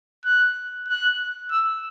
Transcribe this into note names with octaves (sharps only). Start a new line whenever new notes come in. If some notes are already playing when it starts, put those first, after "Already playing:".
F#6
F#6
E6